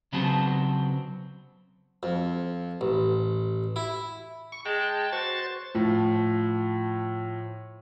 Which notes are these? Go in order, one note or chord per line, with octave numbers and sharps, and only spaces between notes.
C#3 F#3 B3 C4 F#4 A5
F2
A1
E4
C#6
G#3 G5 A5
F#4 C5 A6
A2 F3